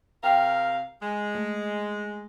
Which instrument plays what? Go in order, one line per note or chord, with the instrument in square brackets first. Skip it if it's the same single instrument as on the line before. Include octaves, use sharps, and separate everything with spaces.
[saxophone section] C3 A#4 F5 [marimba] G5
[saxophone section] G#3
[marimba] A3